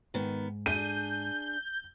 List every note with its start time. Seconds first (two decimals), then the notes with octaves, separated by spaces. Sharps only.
0.14 G#2 D#3 B3
0.66 D4 G#4 G6 D#7